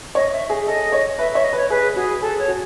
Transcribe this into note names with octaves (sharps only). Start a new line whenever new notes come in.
C#5 D#5
E5
G#4
A4 D#5
C#5
B4 E5
C#5 E5
D#5
B4 C#5
G#4 B4
F#4 G#4
G#4 A4
C#5
F#4